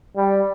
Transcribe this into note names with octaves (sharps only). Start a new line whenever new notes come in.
G3